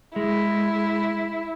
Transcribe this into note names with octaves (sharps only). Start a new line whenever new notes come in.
G#3 E4